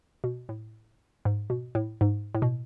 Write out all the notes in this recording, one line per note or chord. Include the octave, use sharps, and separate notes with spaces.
B2
A2
G#2
B2
A2
G#2
A2
B2